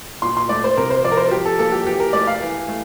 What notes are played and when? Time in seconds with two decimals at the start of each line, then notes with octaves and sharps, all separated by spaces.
0.22 A#2 C6
0.37 C6
0.49 A3 D5
0.64 C5
0.77 C3 A#4
0.90 C5
1.04 F3 D5
1.12 A#4
1.17 C5
1.31 F3 G4
1.46 A4
1.59 A#3 A4
1.72 G4
1.86 E3 G4
2.00 A#4
2.13 A3 D5
2.27 F5
2.41 E3
2.68 A3